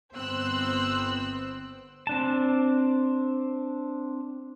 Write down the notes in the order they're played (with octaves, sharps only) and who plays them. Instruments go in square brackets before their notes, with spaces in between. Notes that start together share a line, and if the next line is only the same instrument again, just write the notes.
[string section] G1 B3 C4 C5 E6 F#6
[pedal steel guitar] C4 D4 A5